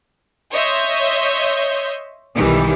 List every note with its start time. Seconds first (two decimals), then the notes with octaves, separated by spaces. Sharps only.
0.52 C#5 D#5 E5 C6 G6
2.36 B1 D#3 E3 G3